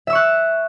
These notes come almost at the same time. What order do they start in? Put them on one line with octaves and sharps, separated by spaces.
E5 E6 C#6 F#6